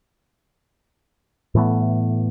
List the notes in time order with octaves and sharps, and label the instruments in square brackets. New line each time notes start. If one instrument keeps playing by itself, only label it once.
[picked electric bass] A2 E3 A3 B3